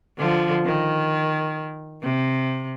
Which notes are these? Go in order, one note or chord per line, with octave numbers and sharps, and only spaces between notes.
D3 F3
D#3
C3